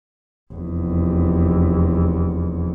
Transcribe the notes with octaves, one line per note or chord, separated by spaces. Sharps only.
F1 E2